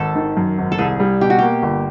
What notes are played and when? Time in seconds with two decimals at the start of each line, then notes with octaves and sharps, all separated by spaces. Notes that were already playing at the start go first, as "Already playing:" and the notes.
Already playing: G#1 A4
0.15 D#3
0.37 F#2
0.58 G#1
0.72 A4
0.78 C2 G#4
1.00 G3
1.21 B2 G4
1.30 F#4
1.39 A#3 G4
1.63 G1